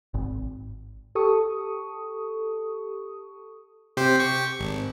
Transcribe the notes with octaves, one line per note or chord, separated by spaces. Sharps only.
G#1
G4 A4 C#6 D#6
C3 G4 C5
G4 C#6
G#1